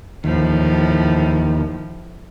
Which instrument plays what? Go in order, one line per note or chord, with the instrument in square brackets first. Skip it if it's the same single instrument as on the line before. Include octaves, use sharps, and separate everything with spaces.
[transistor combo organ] D#2 [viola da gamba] A2 F3